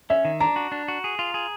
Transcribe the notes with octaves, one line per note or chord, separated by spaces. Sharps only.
C#4 E5
D#3
D4 A#5
F#4
D4
F#4
G#4
F4
G#4